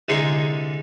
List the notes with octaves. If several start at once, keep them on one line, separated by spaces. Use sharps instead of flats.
C2 D3 G#3 D#4 G#4 C6